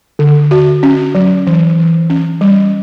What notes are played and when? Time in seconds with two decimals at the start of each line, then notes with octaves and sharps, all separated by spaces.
0.19 D3
0.51 F#4
0.83 C#4
1.15 F#3
1.47 E3
1.78 E3
2.10 C#4
2.41 G3